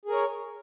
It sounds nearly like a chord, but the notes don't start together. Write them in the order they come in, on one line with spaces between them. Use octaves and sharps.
G#4 A#4 C#5